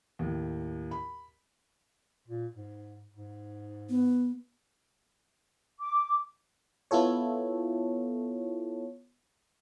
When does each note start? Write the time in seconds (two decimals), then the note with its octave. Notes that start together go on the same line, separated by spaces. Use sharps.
0.19 D#2 A2
0.91 B5
2.28 A#2
2.55 G#2
3.14 G#2
3.89 B3
5.80 D6
6.91 B3 E4 F4 A4 C#5